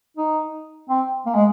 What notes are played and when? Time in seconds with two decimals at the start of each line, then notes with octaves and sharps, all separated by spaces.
0.17 D#4
0.89 C4
1.26 A#3
1.35 G#3